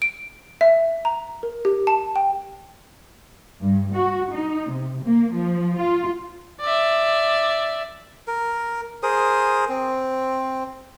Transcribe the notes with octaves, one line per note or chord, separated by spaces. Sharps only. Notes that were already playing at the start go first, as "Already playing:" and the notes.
D7
E5
A#5
A#4
G4
A5
G5
G2
F#4
D#4
C3
A#3
F3
F4
D5 E5
A#4
G#4 A#4 C5 D#6
C4